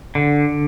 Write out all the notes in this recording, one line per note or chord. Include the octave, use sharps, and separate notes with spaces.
D3